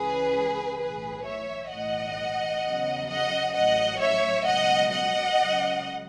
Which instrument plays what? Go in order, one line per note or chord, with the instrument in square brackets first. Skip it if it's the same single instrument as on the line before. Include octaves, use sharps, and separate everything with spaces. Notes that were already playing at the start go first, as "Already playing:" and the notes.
Already playing: [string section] C#2 C#3 E3 G#4 B4
B1 A2 E3 G#4 B4
C#5 E5
B1 A2 E3 D#5 F#5
E2 C#3 F#3
D#5 F#5
A1 A2 F#3 D#5 F#5
C#5 E5
C#2 B2 F#3 D#5 F#5
D#5 F#5
C#2 C#3 F#3